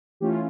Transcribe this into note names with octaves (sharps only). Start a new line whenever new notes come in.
E3 A3 C#4 F4 G4